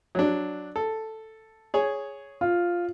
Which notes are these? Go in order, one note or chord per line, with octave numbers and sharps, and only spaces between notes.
F#3 D4
A4
G#4 C#5
F4